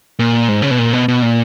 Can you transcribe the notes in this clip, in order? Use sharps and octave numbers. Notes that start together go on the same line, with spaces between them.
A#2
G#2
C#3
B2
A#2
B2
B2
A#2